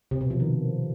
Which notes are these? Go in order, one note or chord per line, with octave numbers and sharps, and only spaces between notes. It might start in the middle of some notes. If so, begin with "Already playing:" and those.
C3
B2
F3
D#3